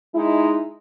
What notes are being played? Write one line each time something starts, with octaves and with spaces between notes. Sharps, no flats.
G#3 D#4 E4